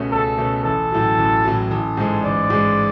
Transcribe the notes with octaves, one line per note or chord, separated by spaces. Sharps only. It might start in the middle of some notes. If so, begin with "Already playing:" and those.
Already playing: C#2 B2 A3 C#4
C#2 A4
B2 A3 C#4
A1 A4
A2 F#3
A1
A2 F#3
A1 A4
G#2 G#3
A1 D5
G#2 G#3